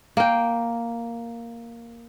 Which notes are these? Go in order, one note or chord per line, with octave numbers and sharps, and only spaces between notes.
A#3 G5